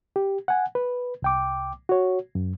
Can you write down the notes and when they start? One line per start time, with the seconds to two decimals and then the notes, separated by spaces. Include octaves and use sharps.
0.16 G4
0.48 F#5 G#5
0.75 B4
1.22 C2 G5 D6
1.89 F#4 C#5
2.35 F#2